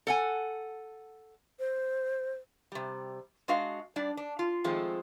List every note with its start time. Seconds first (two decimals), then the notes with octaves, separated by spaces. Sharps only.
0.07 A4 F#5 G#5
1.59 C5
2.72 C3 G3
3.48 G#3 D4 F#4 D#5 F5
3.96 G3 D4 D5
4.17 D4
4.39 F4
4.64 D#3 F3 G#3 A3 C4